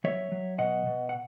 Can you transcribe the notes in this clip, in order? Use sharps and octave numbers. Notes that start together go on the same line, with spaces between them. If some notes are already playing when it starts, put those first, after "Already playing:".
F#3 C#5 E5
F#3
B2 D#5 F#5
B2
F#5